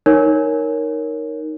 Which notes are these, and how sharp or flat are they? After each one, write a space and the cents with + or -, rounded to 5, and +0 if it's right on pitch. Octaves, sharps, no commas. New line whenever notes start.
D#4 +0 A#4 +0 C#5 +0